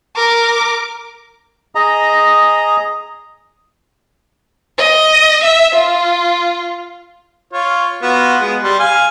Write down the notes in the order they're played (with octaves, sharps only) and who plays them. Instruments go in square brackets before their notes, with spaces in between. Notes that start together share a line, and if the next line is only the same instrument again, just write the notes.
[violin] A#4 D6
[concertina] G#4 D#5 A#5
[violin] D#5
E5
F4
[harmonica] F4 C#5
B3 F4 F#4
G#3 B3
G3 C6
F5 G#5 F6